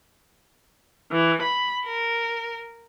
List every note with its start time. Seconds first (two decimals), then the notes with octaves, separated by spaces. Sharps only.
1.11 E3
1.42 B5
1.85 A#4